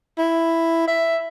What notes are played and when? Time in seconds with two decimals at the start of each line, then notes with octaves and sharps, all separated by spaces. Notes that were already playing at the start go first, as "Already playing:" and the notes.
0.18 E4
0.87 E5